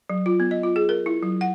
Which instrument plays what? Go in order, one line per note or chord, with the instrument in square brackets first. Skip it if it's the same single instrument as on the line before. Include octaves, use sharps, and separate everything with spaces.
[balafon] F#3
F4
B3
D#5
F4
G#4
A#4
E4
F#3
F#5